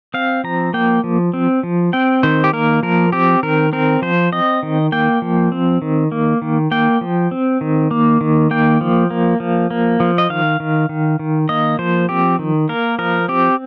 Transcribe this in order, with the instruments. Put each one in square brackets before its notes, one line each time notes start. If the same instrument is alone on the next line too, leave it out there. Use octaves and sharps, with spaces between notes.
[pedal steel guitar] C4 F5
F3 A#5
A#3 G5
F3
C4
F3
C4 G5
D#3 C5
G4
A#3 A#4
F3 A#4
C4 G4
D#3 A#4
C4 A#4
F3 C5
C4 D#5
D#3
A#3 G5
F3
C4
D#3
A#3
D#3
A#3 G5
F3
C4
D#3
A#3
D#3
A#3 G5
F3
A#3
F3
A#3
F3
D#5
D#3 F5
D#3
D#3
D#3
A#3 D#5
F3 C5
C4 G4
D#3
A#3 A#4
F3 A#4
C4 G4